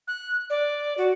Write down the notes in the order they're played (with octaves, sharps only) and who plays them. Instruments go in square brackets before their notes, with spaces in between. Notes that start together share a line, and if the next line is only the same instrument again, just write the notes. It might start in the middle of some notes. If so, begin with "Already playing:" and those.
[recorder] F#6
D5
F#4